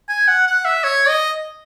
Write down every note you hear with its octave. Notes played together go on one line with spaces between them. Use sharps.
G#5
F#5
F#5
E5
C#5
D#5